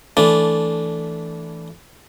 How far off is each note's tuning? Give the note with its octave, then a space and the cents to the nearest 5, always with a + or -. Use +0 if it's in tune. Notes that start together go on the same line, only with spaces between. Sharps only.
E3 +0 A3 +0 D4 -15